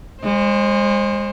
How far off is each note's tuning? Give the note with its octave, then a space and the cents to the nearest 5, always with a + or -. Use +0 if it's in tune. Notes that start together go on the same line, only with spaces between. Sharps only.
G#3 -25 C5 +25